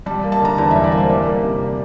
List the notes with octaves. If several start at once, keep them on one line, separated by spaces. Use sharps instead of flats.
G3 A5
A#3
A5
D3 A#5
E2 A#5
G3 E5
D5
A#3
C5
G3 D5
A#3
C3